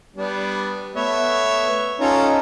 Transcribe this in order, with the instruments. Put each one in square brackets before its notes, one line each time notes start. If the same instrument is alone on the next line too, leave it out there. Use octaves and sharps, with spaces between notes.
[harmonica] G3 B3 D4
[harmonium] A3 B3 B4 [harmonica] C#5 E5
[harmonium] C#4 D#4 C#5 [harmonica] F4 A4 A#5